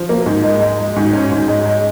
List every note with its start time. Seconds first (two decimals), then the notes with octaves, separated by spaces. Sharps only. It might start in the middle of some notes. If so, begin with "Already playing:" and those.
Already playing: F3
0.09 A#3
0.26 G#2
0.43 G#3
0.61 G#3
0.79 G#3
0.96 G#2
1.13 C#4
1.31 G#2
1.48 G#3
1.66 G#3